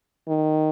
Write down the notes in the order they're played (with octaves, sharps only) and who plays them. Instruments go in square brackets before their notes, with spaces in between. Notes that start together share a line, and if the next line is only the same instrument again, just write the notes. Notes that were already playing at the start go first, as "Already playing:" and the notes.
[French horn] D#3